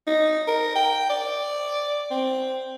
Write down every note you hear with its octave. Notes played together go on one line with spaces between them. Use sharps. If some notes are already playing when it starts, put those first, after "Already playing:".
D#4
A#4
G5
D5
C4